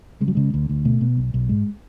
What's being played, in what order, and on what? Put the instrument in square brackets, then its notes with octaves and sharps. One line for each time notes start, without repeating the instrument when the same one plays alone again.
[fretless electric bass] C#3 G#3
F#3
C#3 G#3
D2
D2
B2 A3
B2
B1
B1
G#2 G#3